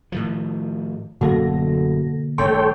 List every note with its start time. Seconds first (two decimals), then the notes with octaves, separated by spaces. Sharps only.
0.12 A2 D#3 F3
1.21 D1 F#2 B2 D3 A#3 F#4 A4 A#6
2.38 D#1 G2 A3 A4 C#5 G5 C6